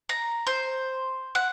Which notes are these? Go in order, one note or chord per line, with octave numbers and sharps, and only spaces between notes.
A#5
C5
F#5